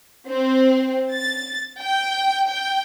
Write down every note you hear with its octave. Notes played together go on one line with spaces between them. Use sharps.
C4
A6
G5
G5